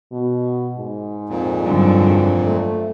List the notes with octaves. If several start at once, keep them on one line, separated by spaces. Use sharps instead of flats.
B2
G#2
F2 A#2
G2 D3 F#3
A3